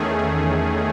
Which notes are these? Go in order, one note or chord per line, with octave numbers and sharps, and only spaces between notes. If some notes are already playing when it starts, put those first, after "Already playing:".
Already playing: E2 D#3 A3 C#4 G#4